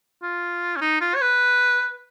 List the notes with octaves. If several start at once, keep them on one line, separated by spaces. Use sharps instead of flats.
F4
C#4
D#4
F4
C#5
B4